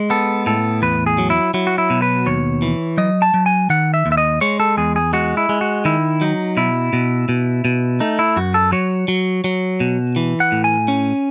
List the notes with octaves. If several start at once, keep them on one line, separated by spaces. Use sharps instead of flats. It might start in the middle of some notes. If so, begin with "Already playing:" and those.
Already playing: G#3
B3 A4
A2 A4
E2 B4
G#4
F#3
E4
F#3 E4
F#4
E4
B2
B4
D#2 C#5
E3
F#3 D#5
A5
F#3
G#5
D#3 F#5
E5
D#2
E5
D#5
G#3 C#5
A4
E2 G#4
G#4
G#3 F#4
E4
G#3
F#4
D#3 E4
F#3 D#4
B2 E4
B2
B2
B2
A3 D#4
E4
F#2 F#4
A4
F#3 C#5
F#3
F#3
B2
E3
F#5
A2
G#5
C#4